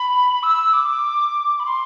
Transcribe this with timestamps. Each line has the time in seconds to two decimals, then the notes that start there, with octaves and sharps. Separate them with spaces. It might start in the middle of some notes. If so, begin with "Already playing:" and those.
Already playing: B5
0.43 E6
0.73 D6
1.59 B5
1.66 C6